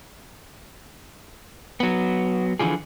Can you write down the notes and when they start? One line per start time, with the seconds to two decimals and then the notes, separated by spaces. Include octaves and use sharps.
1.80 F#3 B3
2.59 D3 E3 F3 G#4